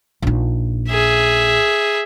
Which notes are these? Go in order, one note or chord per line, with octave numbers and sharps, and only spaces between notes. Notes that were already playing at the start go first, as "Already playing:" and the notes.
A#1 D#4
G#4 E5